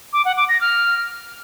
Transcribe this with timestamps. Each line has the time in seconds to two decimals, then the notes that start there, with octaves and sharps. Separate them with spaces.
0.13 D6
0.25 F#5
0.37 D6
0.49 A#6
0.61 F6